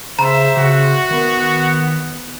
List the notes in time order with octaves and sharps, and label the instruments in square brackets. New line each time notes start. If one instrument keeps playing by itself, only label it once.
[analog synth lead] C#3 [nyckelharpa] C5 E5 [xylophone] A#5 B5
[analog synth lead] C#3 [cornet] F#4
[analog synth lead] D#3 [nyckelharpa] B3